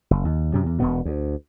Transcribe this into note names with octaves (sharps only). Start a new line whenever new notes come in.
F#1
D#2
F#2 C3
E2
E1 B2 B3
D2